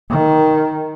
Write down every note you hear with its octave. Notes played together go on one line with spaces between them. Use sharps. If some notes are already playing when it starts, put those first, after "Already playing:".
D#3